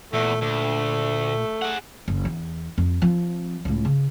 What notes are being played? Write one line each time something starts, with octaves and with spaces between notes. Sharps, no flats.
E2 A#2 A3
D2 A3
G#4 F#5
F#1
E2
F2
F3 C4
C#2 A2
C#3